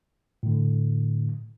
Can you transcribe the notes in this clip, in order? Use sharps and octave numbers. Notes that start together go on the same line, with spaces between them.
A2 D3